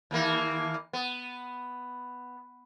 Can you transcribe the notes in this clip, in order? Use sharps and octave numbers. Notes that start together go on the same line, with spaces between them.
D#2 E3 A#3
B3